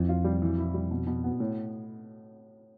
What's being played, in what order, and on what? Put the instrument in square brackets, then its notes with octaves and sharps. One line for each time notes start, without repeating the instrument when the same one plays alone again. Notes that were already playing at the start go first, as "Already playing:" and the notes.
Already playing: [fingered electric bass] F2 [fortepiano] E3
[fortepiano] F4
G3
E3
E4
G3
B2
B2
B3
A2